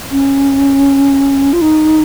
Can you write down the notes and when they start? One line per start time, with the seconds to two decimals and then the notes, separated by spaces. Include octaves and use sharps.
0.11 C#4
1.53 F4
1.62 D#4